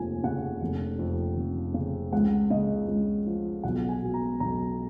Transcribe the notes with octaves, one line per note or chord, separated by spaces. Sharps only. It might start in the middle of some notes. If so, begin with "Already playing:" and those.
Already playing: F1 D#2 F3 G#5
C#3 F#5
F1
F2
F1
C#3
C#2 F#5
C#3 D#5
C#2
F3
B1 F#5
G#5
B2
A#5
B1 A#5